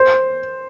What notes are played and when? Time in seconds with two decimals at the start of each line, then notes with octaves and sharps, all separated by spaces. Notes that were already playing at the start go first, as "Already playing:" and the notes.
Already playing: C5